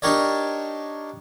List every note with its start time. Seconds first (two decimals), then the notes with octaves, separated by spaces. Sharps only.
0.02 D4 D#4 G4 A#4 C#5 D5